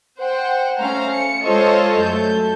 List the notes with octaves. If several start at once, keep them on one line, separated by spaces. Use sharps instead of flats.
C5 F#5 G5
A3 C#4 C5 F5 A#5
C#7
G#3 F4 A4 C5 C#5 D#5
F#2 A3 A4 G6